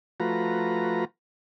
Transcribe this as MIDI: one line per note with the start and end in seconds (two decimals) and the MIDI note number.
0.20 1.05 53
0.20 1.05 57
0.20 1.05 65
0.20 1.05 66
0.20 1.05 71
0.20 1.05 82